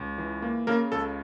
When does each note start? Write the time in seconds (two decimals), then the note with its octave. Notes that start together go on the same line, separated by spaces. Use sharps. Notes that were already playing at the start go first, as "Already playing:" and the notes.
Already playing: C#2
0.18 E3
0.42 A#3
0.67 C#3 A#3 A#4
0.92 C#2 A4